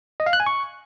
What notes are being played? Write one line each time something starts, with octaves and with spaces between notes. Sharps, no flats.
D#5
F5
F#6
G#5
C#6